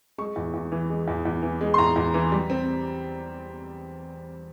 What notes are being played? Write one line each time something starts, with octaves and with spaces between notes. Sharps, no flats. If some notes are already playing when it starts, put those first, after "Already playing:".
G#3 C#6
E2
E2
E3
G#3
E2
E2
E3
G#3
C6
E2 A#5
E2
E3
G3
C4